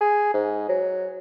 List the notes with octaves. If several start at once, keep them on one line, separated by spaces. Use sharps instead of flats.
G#4
G#2
F#3